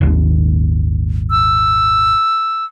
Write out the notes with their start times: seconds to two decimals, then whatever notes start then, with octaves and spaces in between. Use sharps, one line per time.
0.01 D#1 G#1 D#2
1.31 E6